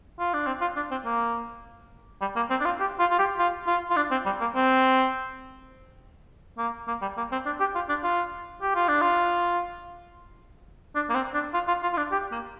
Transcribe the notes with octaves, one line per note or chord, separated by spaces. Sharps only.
F4
D4
C4
F4
D4
C4
A#3
G3
A#3
C4
D4
F4
G4
F4
F4
G4
F4
F4
F4
D4
C4
G3
A#3
C4
A#3
A#3
G3
A#3
C4
D4
G4
F4
D4
F4
G4
F4
D4
F4
D4
A#3
C4
D4
F4
F4
F4
F4
D4
G4
A#3